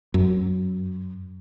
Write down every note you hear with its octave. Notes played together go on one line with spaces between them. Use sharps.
F#2